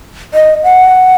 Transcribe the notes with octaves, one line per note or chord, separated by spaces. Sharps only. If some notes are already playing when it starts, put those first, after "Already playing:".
D#5
F#5